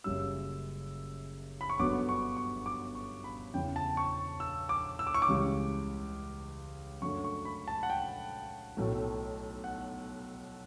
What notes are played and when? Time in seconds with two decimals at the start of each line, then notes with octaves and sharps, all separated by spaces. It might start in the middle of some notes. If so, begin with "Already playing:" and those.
0.04 F#1 F#2 C#3 G3 C#4 E6
1.61 B5
1.70 C#6
1.79 G1 F#2 D3 F#3 B3 D6
2.09 C#6
2.37 C#6
2.66 D6
2.95 C#6
3.24 B5
3.53 E2 C#3 E3 G5
3.76 A5
3.97 C#6
4.40 E6
4.69 D6
4.99 E6
5.07 D6
5.14 C#6
5.22 D6
5.28 C#2 C#3 E3 G3
7.02 F#2 D3 A3 C#6
7.24 C#6
7.45 B5
7.68 A5
7.83 F#5
7.90 G5
8.77 B1 A2 F#3 A3
9.64 F#5